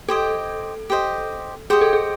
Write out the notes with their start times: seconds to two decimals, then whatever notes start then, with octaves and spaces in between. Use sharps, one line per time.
0.08 G4 A4 C5 D#5
0.90 G4 C5 D#5
1.70 G4 G#4 C5 D#5
1.81 A4
1.93 G#4